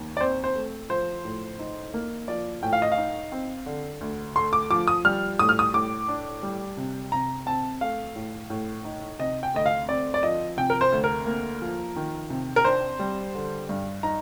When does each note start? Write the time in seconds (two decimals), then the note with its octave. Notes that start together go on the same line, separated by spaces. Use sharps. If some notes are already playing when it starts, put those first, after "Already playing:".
Already playing: D#2
0.17 D5
0.21 C4 C5
0.44 C5
0.55 A3
0.90 F3 C5
1.25 A2
1.59 D#4
1.94 A#3
2.28 F3 D5
2.63 A2 G5
2.73 F5
2.82 D#5
2.92 F5
2.98 D#4
3.32 C4
3.66 D3
4.01 D2
4.36 A3 C6
4.53 D6
4.71 F3 D6
4.88 D#6
5.05 G3 F6
5.39 A2 D#6
5.49 F6
5.59 D#6
5.74 A2 D6
6.08 D4
6.43 G3
6.77 C3
7.12 C3 A#5
7.46 C4 A5
7.81 A3 F5
8.16 A2
8.50 A2
8.85 D#4
9.19 C3 D#5
9.43 G5
9.54 D2 D#5
9.66 F5
9.88 C4 D5
10.14 D5
10.23 F3 D#5
10.57 C3 G5
10.70 A#4
10.81 C5
10.92 D2
11.04 A#4
11.26 A#3
11.62 F3
11.96 D#3
12.30 C3
12.56 A#4
12.65 D4 C5
12.99 G3
13.35 D3
13.69 G2
14.03 D#4 A#5